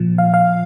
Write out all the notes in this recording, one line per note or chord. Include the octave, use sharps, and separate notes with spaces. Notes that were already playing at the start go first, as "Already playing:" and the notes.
Already playing: A#2 F3
F5
F5